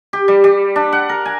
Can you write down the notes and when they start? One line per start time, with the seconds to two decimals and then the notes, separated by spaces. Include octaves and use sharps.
0.13 G4
0.28 G3
0.44 G3
0.76 D4
0.92 F#5
1.09 A#4
1.26 G#5